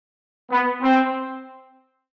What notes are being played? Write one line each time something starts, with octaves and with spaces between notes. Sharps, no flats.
B3
C4